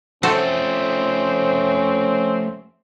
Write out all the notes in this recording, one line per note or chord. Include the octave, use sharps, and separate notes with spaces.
F3 A3 C4 C#4 F#4 A4 C5